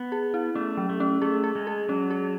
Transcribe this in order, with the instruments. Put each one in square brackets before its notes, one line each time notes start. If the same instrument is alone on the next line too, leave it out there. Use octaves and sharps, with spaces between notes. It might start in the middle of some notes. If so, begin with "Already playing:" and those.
Already playing: [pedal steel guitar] B3
[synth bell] G#4
E4
[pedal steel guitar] A3 [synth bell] C#4
[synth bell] F#3
[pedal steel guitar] A3
[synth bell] C#4
[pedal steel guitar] A3 [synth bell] G#4
[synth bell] G#4
[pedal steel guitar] G#3
[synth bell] G#4
[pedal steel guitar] F#3 [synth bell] C#4
[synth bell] G#4